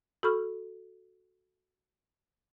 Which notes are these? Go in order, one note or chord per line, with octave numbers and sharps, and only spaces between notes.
F#4 A4 B5 C#6 F6